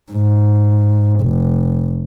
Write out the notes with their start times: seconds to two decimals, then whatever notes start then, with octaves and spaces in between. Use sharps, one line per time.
0.12 G#2
1.21 F1